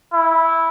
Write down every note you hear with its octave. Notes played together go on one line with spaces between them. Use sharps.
E4